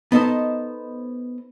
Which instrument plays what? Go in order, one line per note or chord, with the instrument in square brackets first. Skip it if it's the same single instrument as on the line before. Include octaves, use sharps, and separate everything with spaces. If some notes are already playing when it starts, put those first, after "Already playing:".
[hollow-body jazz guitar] B3 D#4 A4 C5 D#5